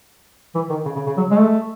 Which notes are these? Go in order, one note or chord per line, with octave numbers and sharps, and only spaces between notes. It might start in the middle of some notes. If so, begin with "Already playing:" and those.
E3
D#3
C#3
C#3
C#3
F#3
G#3
A3